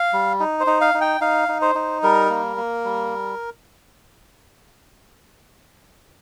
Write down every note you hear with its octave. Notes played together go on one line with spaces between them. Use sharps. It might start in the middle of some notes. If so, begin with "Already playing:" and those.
Already playing: F5
G3
D#4
C5
D#4
F5
D#4
G5
D#4 F5
D#4
C5
D#4
G3 A#4
A#3
A#3
G3